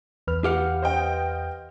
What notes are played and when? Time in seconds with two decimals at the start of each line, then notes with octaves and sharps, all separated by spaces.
0.27 E2 B4 F6
0.44 G4 F5 F#5
0.82 C5 D#5 G5